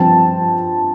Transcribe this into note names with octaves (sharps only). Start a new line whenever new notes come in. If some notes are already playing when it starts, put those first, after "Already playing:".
Already playing: G2 F3 C4 A5